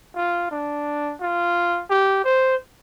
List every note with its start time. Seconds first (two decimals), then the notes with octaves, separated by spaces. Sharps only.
0.16 F4
0.51 D4
1.21 F4
1.90 G4
2.24 C5